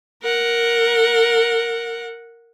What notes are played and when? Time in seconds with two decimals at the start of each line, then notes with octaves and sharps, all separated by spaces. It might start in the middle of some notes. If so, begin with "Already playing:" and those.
0.22 A#4 F#5